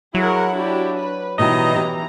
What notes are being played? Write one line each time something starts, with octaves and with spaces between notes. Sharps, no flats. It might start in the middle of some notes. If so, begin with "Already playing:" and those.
F#3 E4 G#4 A#4 F#5
D4 F#4 G4
B4
B2 D#3 E3 G3 E4 D#5 A#5
G4